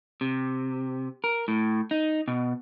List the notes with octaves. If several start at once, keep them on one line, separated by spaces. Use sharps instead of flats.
C3
A#4
A2
D#4
B2